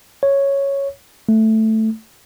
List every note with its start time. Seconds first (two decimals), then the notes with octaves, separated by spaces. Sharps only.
0.23 C#5
1.29 A3